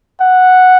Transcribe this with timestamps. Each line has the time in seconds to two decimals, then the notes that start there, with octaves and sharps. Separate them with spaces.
0.21 F#5